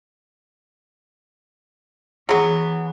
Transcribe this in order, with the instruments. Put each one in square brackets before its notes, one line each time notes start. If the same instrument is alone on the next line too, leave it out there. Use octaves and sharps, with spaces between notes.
[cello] E3 [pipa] F#3 B3 [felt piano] G#4